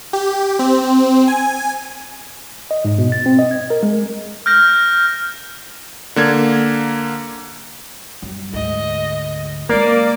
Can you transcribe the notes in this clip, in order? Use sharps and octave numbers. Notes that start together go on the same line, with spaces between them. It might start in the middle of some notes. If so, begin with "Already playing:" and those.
G4
C4
G#5
D#5
G#2
B2
A6
C4
D#5
G#6
A#4
G#3
F6 G6 A#6
D3 A#3 G#6
F#2 G3
D2 G#2 D#5
G#3 A#3 C#4 D5